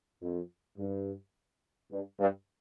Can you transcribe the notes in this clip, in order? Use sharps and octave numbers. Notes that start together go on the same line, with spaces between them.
F2
G2
G2
G2